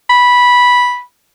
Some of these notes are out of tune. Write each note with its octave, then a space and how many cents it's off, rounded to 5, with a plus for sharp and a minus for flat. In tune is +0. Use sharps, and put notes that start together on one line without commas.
B5 -10